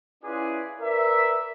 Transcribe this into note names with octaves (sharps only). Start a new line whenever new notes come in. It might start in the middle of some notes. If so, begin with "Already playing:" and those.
C#4 E4 F4 G#4 B4 D5
A#4 B4 D5 E5